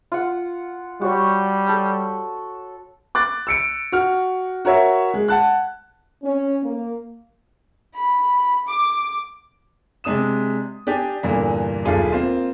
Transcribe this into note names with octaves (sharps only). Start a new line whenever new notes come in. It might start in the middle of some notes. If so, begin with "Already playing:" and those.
F4 F#5
G3 F#4 C#5
A4
D6 F#6 A6
E6 C#7 D7
F#4 F6
F#4 A#4 C#5 E5
G#3
F#5 A5 F#6
C#4
A#3
B5
D6
C3 G#3 D4 D#6 E7
D4 G4 G#5
E2 G2 A#2 D3 E3 A#3
D#1 B1 D4 F4 G#4 A4
A#3 C4 F4